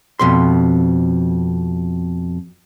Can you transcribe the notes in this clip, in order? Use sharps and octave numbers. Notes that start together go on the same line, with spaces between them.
F2 B2 C6